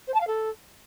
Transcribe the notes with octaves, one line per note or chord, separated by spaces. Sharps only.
C5
A5
F5
A4